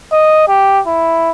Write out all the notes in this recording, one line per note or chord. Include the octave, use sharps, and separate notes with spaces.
D#5
G4
E4